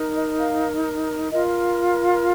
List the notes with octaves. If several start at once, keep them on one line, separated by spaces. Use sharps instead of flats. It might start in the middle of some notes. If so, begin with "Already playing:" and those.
Already playing: D#4 A#4
D#5
F5
F4 A#4 D#5